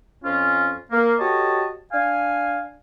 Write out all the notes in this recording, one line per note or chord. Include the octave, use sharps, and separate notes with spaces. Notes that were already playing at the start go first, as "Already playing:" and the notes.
F2 C#4 F4
A#3
F#4 G4 A4 C#5 D#5 A5
D4 F5 G#5